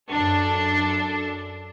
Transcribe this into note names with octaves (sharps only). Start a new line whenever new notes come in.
F#2 D4 A4